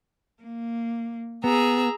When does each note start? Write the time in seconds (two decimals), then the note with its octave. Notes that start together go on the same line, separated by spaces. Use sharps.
0.42 A#3
1.44 B3 G#4 A#5 E6